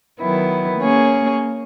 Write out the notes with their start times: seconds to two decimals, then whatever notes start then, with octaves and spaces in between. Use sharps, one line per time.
0.20 D#3 F#3 B3 E4
0.80 A#3 C#4 G#4 C#5